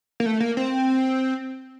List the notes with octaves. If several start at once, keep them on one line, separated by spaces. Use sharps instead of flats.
A#3
A3
A#3
C4